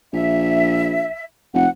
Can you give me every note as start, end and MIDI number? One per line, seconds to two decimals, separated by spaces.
0.13 1.07 34
0.13 1.24 76
1.54 1.66 29
1.54 1.69 78